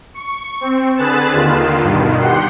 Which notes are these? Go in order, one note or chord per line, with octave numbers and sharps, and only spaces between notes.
C#6
C4
D3 G#4 B4 F#6 A6 E7
D#2 D3 D#3 F4
G2 B2 D#3
G4 F#5 C6